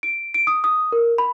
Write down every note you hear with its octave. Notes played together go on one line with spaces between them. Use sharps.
D7
D7
D#6
D#6
A#4
B5